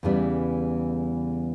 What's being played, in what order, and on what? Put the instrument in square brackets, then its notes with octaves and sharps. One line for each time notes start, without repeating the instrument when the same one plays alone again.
[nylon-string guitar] E2 C#3 E3 G3 B3